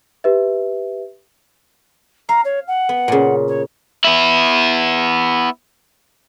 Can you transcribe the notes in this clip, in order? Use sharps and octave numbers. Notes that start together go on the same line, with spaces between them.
G4 B4 E5
F5 A#5
C#5
F#5
B3
A#2 C#3
C#5
B3 E4